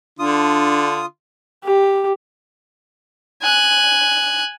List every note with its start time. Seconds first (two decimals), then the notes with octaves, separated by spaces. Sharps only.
0.19 D3 D4 F4 D#6
1.64 G4
3.42 G#5 F#6